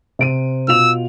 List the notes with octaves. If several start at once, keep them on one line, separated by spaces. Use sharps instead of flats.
C3 D7 D#7
B2 F4 E6 F7